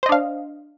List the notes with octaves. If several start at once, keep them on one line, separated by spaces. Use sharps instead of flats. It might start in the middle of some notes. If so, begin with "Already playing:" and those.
D4 C5 D#5 F5